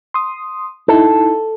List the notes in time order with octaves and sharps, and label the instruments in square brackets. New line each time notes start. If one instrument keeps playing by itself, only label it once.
[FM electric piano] C6 D#6
[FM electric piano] D#4 E4 [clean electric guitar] A4